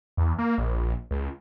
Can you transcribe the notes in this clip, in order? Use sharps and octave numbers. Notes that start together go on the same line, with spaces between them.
E2
A#3
A#1
C#2